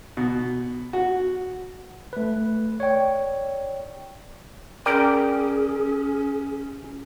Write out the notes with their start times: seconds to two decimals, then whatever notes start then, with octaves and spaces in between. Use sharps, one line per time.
0.17 B2
0.93 F#4
2.13 A3 B4
2.80 C#5 D5 G5 C#6
4.86 C#4 G#4 A#4 D5 G5